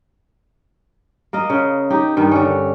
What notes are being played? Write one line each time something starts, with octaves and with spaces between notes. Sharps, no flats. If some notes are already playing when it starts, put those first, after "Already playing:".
A#3 A#4 D#5
C#3
D#4 G4
G2 D#3 D#4
D3 C#4